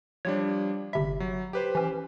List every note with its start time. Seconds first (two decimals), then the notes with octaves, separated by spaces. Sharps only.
0.25 F3 G3 D4 C#5
0.93 G1 C3 E5 B5
1.20 F#3
1.53 G4 B4 C5
1.75 E3 C#4